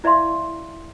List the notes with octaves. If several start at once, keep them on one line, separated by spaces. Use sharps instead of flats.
E4 D5 E5 F5 C6